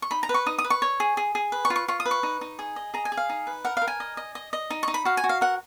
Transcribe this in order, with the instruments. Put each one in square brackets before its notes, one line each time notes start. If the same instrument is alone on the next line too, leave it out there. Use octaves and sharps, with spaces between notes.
[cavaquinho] C#6
D#4 B5
A#5
B4
C#6
D#4 D#6
D#6
B4
C#6
C#5
G#4
G#4
G#4
B4
C#6
F4
C#6
F4 C#6
D#6
B4
C#6
D#4
D#4
G#4
D#5
G#4 A#5
G#5
G#4
F5
D#4
B4
A#4 F#5
F5
A#4
G#5
D#5
D#5
D#5
D#5
D#4
C#6
D#4
B5
F#4 F5
G#5
F#4
F5
A#4 F#5